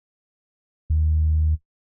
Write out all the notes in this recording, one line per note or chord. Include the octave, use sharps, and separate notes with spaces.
D#2